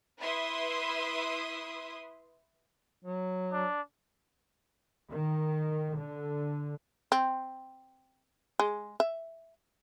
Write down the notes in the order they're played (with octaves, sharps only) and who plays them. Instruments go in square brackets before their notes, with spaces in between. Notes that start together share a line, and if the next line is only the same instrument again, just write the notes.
[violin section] E4 B4 E5 C6 D#6
[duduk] F#3
[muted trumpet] D4
[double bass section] D#3
D3
[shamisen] C4
G#3
E5